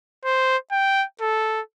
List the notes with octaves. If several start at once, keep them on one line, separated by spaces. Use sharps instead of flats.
C5
G5
A4